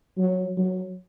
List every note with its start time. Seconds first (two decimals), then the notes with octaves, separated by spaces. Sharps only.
0.18 F#3
0.57 F#3